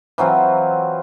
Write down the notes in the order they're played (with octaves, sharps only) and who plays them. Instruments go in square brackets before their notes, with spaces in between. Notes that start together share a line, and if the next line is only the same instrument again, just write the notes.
[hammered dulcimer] E3 F#3 C4 F4